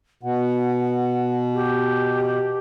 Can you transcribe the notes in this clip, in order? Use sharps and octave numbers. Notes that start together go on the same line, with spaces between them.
B2 F#5
G4